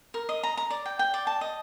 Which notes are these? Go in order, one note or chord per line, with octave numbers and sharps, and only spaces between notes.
A#4
D#5
A#5
A#5
D5
G5
G5
D5
A5
D#5